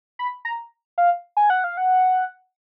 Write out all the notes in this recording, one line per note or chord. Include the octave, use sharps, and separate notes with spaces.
B5
A#5
F5
G#5
F#5
F5
F#5